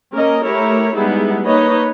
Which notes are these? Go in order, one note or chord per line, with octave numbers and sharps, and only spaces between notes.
A#3 C#4 A#4 D#5
A3 E4 G4 A#4 C#5
G3 G#3 B3 D#4 E4 G#4
A#3 D#4 B4 C#5 D#5